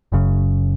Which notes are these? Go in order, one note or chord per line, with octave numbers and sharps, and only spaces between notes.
F#1 F#2 C#3